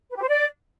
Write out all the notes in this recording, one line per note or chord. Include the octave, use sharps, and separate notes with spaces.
B4
G4
C5
D5